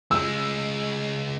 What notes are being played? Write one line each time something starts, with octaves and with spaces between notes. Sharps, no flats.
C#2 G#3 E6